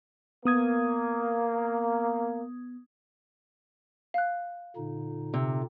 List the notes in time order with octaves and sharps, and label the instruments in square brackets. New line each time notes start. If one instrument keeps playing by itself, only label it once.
[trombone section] A#3 [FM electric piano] B3 D#6 G#6
[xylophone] F5 F#6
[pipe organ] A#2 D3 D#4
[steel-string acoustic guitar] C3